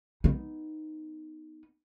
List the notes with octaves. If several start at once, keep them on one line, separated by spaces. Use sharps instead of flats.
B3 D#4